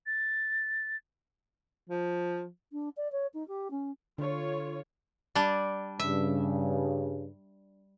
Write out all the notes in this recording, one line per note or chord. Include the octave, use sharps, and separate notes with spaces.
A6
F3
D4
D5
C#5
D#4
G4
C#4
D3 F4 C#5
G3 D4
G2 C#3 E5